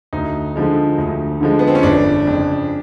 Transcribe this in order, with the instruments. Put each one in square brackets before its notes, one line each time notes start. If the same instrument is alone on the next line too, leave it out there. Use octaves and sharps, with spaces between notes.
[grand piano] D2 [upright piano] D#4
[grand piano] D3 F3 G#3
D2
D3 F3 G#3
[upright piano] B3
C4
C#4
[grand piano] G1 [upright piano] D4
[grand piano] F2 C#3